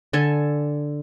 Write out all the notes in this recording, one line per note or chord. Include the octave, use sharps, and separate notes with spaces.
D3 A4 G#5